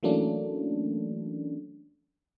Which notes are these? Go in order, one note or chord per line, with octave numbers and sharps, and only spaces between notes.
E3 F#3 A3 A#3 C#4 D4